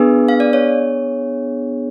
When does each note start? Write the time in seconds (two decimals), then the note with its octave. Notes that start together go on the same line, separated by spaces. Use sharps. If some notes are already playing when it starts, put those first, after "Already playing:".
Already playing: B3 D4 G#4 B4
0.29 F5
0.40 D5
0.53 C#5